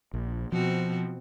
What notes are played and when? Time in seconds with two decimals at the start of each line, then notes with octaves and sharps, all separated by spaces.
0.14 A#1
0.52 B2 F3 C4 F#4